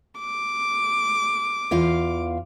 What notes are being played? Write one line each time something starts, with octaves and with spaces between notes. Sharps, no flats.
D6
E2 F4 F5